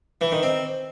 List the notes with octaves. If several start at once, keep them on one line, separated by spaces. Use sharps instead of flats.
E3
D#3
C4